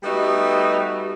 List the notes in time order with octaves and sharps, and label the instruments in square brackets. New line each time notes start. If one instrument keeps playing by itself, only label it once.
[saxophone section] G3 A3 B3 D#4 F#4